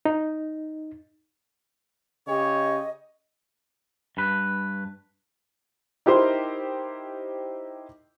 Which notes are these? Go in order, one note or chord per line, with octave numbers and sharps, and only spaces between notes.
D#4
C#3 G4 C#5 D#5
G2 B4
D#4 E4 G4 A#4 C5 C6